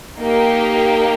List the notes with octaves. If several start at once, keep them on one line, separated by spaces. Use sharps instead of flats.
A#3 D#4 G4